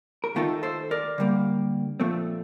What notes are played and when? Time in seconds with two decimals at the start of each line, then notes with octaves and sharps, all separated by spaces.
0.24 A#4
0.36 D#3 A3 D#4 F4 A4
0.63 A4 C5
0.91 A#4 D5
1.18 D3 G3 A#3
2.00 A#2 F3 A3 C4